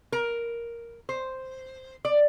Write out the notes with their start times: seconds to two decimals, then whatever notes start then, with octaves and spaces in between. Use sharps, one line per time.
0.12 A#4
1.09 C5
2.05 D5